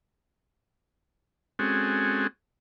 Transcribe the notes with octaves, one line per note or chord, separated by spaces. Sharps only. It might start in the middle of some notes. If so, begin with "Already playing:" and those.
G#3 C4 C#4 F#4 G#4 A4